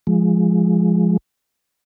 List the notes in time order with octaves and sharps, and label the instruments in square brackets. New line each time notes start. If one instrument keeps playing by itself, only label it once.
[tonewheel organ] F3 G#3